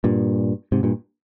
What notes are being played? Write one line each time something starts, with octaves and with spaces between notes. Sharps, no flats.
G2 A#2
G#2 C3
G2 A#2